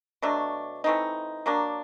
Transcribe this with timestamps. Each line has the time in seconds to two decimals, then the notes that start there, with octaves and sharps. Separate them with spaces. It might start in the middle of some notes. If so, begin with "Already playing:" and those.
0.22 B2 F#3 A3 D4
0.84 E3 A3 C4 D#4
1.46 F#3 A#3 D4